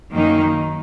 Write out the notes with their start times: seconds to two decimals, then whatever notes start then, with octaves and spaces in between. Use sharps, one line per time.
0.12 F#2 D#3 A#3 D#4